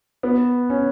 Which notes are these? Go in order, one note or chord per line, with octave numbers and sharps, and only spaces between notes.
B3
C#4